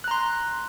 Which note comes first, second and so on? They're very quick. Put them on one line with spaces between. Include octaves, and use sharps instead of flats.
F#6 A#5 C6